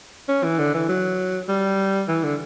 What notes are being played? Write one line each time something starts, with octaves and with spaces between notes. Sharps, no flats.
C#4
E3
D3
E3
F#3
G3
E3
D3